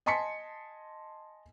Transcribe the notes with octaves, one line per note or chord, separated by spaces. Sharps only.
D#5 G#5 A5 C6 B6 C#7